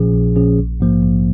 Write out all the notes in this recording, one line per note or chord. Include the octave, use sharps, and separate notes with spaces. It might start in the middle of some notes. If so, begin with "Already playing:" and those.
Already playing: A#1 A#2 F3 C#4 G#4
A#1
A#2 F3 C#4 G#4
A#1
G#2 F3 A#3
A#1